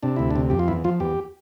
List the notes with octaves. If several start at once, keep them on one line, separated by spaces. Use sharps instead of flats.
C3 D4
D2 E4
D4
C3
F2 G4
F4
E2 E4
F3 F4
E2 G4